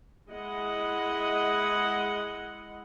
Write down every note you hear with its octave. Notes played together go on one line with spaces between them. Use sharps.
G#3 E4 D#5 F#5